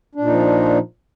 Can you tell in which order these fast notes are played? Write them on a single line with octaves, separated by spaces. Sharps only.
D4 A#2 D#4 F3